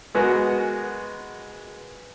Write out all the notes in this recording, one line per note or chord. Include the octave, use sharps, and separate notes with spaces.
G#3 B3 F#4 G#4 A#4